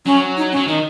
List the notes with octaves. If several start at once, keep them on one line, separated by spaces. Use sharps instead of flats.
F#3 C#4
D#4
C#4
F#3
D#3 D#4